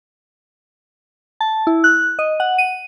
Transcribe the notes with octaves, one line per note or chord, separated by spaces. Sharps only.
A5
E4
F#6
D#5
F#5
D#7